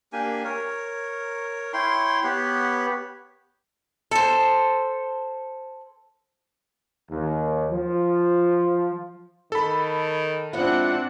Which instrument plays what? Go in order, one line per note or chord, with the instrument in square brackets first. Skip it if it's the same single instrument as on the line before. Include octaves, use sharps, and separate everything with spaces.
[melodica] A#3 D4 G4 G#5
A#4 C#5
E4 C#5 G5 C6
B3 G4 B4 C#5
[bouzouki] A4 C5
[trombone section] D#2
F3
[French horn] D#3 [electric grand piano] A4 B5
[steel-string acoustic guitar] G#2 F3 E4 [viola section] C4 D4 F#5